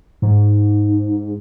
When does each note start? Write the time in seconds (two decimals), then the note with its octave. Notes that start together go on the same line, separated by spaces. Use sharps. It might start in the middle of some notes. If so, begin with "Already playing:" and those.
0.22 G#2